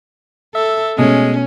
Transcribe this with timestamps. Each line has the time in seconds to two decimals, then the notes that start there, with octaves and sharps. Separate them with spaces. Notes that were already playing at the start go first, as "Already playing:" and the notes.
0.55 A4 E5
0.98 B2 G#3 A3 C#4